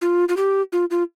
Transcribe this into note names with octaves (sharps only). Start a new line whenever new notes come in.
F4
F4
G4
F4
F4